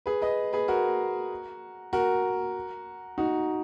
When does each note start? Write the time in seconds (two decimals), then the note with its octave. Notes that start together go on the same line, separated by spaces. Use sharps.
0.06 G#4 B4
0.22 B4 D#5
0.53 G#4 B4
0.68 F#4 A#4
1.93 F#4 A#4
3.18 D#4 F#4